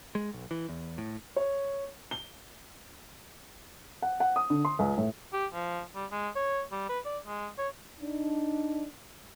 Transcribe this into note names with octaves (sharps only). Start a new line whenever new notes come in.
G#3
B1
E3
E2
A2
C#5
G7
F#5
F#5
D#6
D3
C6
C#2
A2
G4
F3
G3
G#3
C#5
G3
B4
D5
G#3
C#5
D4 D#4